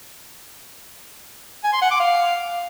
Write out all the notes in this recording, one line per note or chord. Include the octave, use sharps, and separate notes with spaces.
G#5
C6
F#5
D6
F5